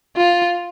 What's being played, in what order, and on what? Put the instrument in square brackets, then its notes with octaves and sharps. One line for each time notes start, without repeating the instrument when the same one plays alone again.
[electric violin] F4